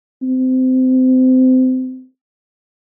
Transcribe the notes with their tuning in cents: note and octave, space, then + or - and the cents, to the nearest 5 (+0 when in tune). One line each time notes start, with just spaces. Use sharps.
C4 -25